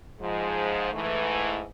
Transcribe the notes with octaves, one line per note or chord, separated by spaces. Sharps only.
G#2 F3 G#3
G#2 E3 A3